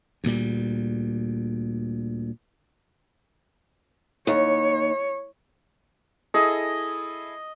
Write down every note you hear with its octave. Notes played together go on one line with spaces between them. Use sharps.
D2 A#2 G3
D#2 C#5
E4 G#4 A4 D#5